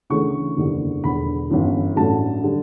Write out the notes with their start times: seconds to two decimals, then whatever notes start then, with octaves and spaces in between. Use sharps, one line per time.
0.10 D2 C#3 E3 A3 C#6
0.57 F#1 E2 D3 G3
1.04 E1 E2 D3 B5
1.50 G1 F#2 E3
1.96 A1 G2 F#3 A3 A5
2.43 D3 G3